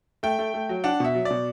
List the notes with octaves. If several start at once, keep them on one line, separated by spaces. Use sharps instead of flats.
A3 G5
A3
A3
F#3
D4 F#5
B2 E5
F#3
D5
B2